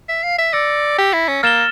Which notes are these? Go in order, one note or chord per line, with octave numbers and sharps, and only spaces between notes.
E5
F5
E5
D5 E6 A#6 C#7
G4
E4
C#4
A#3 F6 A6 E7 G7